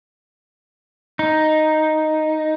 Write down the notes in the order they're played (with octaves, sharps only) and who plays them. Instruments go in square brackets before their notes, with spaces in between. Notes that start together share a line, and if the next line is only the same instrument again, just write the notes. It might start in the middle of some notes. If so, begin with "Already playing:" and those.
[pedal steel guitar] D#4